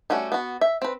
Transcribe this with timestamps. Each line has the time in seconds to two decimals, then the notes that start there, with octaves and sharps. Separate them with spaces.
0.10 G3 A3 C#4 F#4
0.32 B3 F#4
0.61 E5
0.82 C4 B4